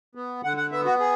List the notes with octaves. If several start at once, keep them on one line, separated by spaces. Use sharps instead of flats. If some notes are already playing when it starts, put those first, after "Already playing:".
B3
D3 F#5
F#5
B3 E5
F#4
G#4